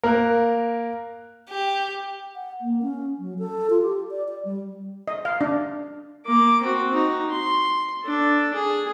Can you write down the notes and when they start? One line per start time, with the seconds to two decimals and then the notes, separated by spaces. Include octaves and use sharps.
0.03 A#3 A#4 F#6
1.50 G4
2.36 F#5
2.61 A#3
2.82 C#4
3.19 F#3
3.39 A4
3.70 F4
3.82 G4
4.11 D5
4.29 D5
4.45 G3
5.08 D#5
5.25 F5
5.41 D4
6.26 A#3 D6
6.62 C4 F#4
6.93 D#4 F#4
7.30 C6
8.04 D4 A4
8.54 G#4